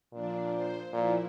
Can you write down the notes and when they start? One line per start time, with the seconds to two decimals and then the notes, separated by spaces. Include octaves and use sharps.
0.13 A#2 F3 D4
0.51 C5
0.93 A#2 F3 E4